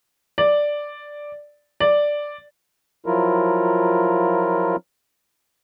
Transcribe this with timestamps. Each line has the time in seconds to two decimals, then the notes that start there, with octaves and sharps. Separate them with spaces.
0.38 D5
1.80 D5
3.06 F3 F#3 E4 F4 A#4